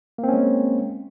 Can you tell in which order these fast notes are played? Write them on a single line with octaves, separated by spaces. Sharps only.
A#3 C4 C#4 G#3